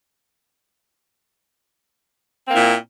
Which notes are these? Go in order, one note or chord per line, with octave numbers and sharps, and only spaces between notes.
A#2 A#3 C4 E4